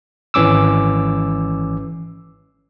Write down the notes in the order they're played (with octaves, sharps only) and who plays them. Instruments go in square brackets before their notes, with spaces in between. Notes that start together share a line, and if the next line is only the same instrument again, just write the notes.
[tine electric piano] G#1 E3 C#4 D6 E6